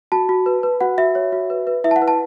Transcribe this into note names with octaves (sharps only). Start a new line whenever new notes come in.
F#4 A5
F#4
B4
B4
F#4 F#5
F#4 E5
C#5
F#4
B4
B4
E4 E5
A5
F#5
B4
A5